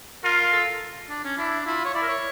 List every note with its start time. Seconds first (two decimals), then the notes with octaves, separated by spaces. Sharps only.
0.24 F4 A#4
0.52 A4
1.09 D4
1.24 C#4
1.37 D4 E4
1.66 E4 F4
1.85 C#5
1.94 E4 D5
2.03 A#4
2.09 C#5